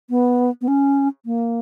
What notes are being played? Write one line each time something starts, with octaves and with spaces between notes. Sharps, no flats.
B3
B3
C#4
A#3